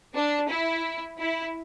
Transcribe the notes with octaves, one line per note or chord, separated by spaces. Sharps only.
D4
E4
E4